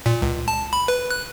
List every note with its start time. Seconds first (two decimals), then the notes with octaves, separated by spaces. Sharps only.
0.06 A#2
0.22 C#2
0.48 A5
0.73 B5
0.88 B4
1.11 F#6